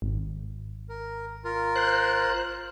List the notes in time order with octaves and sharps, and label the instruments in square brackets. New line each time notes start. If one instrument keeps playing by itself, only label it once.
[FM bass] G#1
[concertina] A#4
F4 A#4
[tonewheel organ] C5 F#6